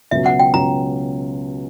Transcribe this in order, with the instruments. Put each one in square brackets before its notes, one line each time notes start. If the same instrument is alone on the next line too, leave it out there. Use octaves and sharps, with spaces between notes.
[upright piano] C#2 B2 F#3 C#4 [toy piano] E5
[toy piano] F#5
G5
[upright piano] C#2 B2 F#3 C#4 [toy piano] A#5